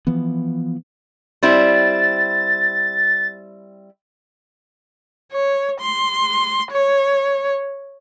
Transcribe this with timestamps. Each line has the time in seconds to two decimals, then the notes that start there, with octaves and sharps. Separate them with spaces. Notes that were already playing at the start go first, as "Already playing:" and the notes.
0.07 E3 F3 B3
1.43 G3 C4 E4 A6
5.32 C#5
5.81 C6
6.72 C#5